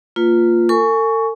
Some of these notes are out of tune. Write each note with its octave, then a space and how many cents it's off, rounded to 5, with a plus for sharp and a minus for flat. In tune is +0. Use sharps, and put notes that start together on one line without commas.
A#3 -20 F4 +0 B4 +0
A4 +45 G#5 +10 C#6 +15